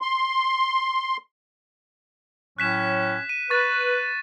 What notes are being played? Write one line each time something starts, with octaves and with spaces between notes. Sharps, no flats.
C6
A2 F#3 C#4 F#6 B6 E7
D#7
B4 C#6 A6